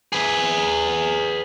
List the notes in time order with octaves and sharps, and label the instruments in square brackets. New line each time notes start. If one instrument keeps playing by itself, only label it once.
[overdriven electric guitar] G#4 B4